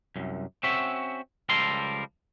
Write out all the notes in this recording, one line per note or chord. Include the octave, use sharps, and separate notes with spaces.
C2 F#2
C4 C#4 F#4 E5
C#2 F3 G3 A4 A#4 C6